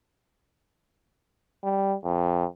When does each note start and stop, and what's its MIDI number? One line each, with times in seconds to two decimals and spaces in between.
1.64 1.95 55
2.04 2.45 41